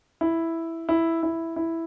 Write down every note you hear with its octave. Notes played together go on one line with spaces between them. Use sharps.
E4
E4
E4
E4